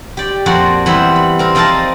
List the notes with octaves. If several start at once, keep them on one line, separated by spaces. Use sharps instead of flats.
G4 D5
F2 A#2 F#4 D5
E3 G3 B3 E4 C5
B5
C4 A#4
F3 D#4 A#4 D5 F5 A5